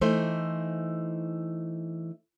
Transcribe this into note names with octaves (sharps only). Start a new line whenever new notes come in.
E3 A3 D#4 C5